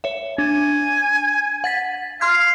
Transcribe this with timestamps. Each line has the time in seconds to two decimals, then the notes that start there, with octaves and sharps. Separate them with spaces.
0.04 C#5 E5
0.38 D4 G#5
1.64 F#5 A6 B6
2.21 F5 C6 F6 G#6